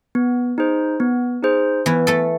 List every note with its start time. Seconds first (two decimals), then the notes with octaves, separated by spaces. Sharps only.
0.15 B3
0.58 D#4 G#4 C5
1.00 B3
1.43 D#4 G#4 C5
1.86 E3 B3 E4
2.07 A3 A4